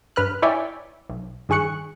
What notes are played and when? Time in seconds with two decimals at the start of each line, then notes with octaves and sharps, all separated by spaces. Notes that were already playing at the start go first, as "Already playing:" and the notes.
0.16 G2 B4 F6 F#6
0.42 E4 C#5 D5 E5 G5 G#5
1.10 B1
1.49 G2 D#3 G#4 C#6 F#6 C#7